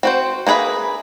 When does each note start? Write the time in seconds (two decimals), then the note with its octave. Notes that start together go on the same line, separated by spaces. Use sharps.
0.03 C4 F#4 C5
0.47 A#3 D4 G#4 B4 E5